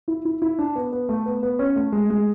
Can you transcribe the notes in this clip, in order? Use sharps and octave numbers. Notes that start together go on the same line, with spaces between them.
E4
E4
E4
D4
B3
B3
A3
B3
B3
C#4
A3
G#3
G#3